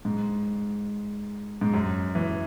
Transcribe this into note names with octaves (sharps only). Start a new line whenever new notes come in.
G#2
G#2
F#2
E3